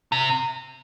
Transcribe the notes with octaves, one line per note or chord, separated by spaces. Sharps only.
C3